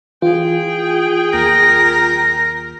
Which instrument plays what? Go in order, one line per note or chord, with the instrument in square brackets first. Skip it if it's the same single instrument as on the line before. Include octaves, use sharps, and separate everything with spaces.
[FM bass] E3 [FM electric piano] F4 [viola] G#4 G5
[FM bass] D#2 [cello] A#4